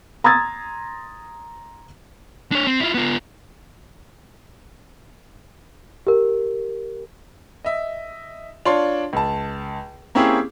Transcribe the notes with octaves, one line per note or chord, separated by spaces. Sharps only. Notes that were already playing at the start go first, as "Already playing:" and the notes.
A#5 C6 D#6 E6 G#6 A6
D4 C#5
C4
E4 F4
B3 F4
G4 A#4
D#5 E5
D4 F4 C#5 C6
C#2 A5
A#3 C4 C#4 E4 G4 G#4